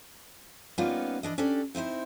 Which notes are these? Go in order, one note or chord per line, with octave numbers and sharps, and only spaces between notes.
G3 A#3 B3 C#4 D#4 F4
E3 D4 D#5
C#4 D4 G4 A4 D5
C4 D#4 E4 C5